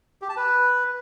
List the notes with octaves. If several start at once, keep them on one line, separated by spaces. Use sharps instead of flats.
G4
A5
B4